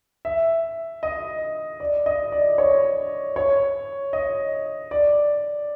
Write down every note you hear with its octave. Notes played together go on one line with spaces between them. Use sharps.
E5
D#5
D5
D#5
D5
C#5
C#5
D#5
D5